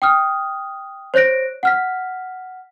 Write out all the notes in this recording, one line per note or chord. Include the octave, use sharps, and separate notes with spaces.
G5 D#6 F6
C5 C#5 F#6 A#6 D7
F#5 F6 B6